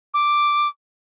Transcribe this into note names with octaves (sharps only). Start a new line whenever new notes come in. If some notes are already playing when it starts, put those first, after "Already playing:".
D6